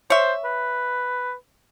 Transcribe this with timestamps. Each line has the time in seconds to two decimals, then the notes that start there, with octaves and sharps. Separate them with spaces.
0.10 C5 C#5 E5
0.45 B4